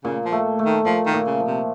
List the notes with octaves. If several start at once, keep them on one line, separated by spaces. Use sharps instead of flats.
A#2 C#3
F3
A3
A3
D#3
A#2 F3
D#3
A#2
C#3
F3
C3